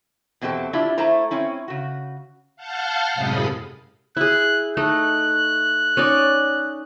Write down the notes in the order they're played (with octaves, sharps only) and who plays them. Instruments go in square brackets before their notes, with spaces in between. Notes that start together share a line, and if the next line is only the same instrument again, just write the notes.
[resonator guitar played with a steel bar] E2 B2 C4 G4 A4
D4 E4 F4 G4 E5
A3 E4 C5 A#5
C4 C#4 E4
C#3 F#4
[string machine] F5 F#5 A5 F6 G6
F#2 A2 C3 G#3 B5 D#6
[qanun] E4 G#4 [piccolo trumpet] F#6
[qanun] A3 D#4 [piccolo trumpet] F#6
[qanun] C#4 D#4 D5